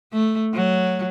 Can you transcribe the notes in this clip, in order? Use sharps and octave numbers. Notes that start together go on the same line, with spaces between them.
A3
F#3